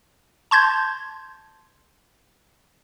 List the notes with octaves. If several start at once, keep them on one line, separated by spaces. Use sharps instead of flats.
A5 C6 G6 G#6